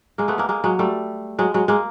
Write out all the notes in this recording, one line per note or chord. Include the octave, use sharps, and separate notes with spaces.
G#3 A#3
A3 B3
G#3 A#3
G#3 A#3
F#3 G#3
G3 A3
F#3 G#3
F#3 G#3
G#3 A#3